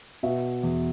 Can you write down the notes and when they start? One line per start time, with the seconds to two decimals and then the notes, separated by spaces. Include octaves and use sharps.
0.23 B2 E5
0.63 E2